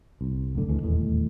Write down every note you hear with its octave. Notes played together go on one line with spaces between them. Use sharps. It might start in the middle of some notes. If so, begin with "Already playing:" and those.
C2
F1 F#2 A2 D3
D2 E3 G#3 A3
D#1 E2 A2 G#3